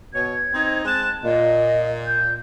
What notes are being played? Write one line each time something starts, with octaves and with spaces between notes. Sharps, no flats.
B2 C#5 G#6
C4 D#4
G#3 C4 A5 F#6
A#2 D#5
G6